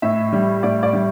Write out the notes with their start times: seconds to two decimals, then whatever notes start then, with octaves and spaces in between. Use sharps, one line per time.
0.02 A2 E5
0.32 G3
0.63 A2 D5
0.83 D5
0.93 G3